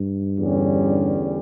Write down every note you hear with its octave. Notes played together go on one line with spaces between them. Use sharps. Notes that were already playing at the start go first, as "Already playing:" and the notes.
Already playing: G2
E2 D3 G3 C#4